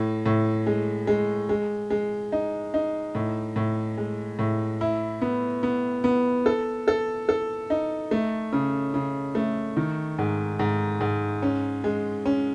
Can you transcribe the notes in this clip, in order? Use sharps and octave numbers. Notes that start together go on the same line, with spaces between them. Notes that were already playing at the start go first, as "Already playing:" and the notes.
Already playing: A2
A2
G#3
G#3
G#3
G#3
D#4
D#4
A2
A2
G#3
A2
E4
B3
B3
B3
A4
A4
A4
D#4
A3
C#3
C#3
A3
D#3
G#2
G#2
G#2
C#4
G#3
C#4